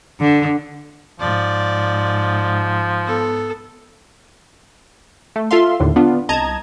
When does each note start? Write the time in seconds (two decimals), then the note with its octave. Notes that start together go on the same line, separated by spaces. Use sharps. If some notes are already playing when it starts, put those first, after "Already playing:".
0.20 D3
1.20 G#2 F3 D5
3.03 B3 A4
5.36 A3
5.51 F4 A4 E5 F5 C6
5.80 D#2 A2 D3
5.96 B3 D4 F4
6.29 C2 D#5 A5 A#5 G#6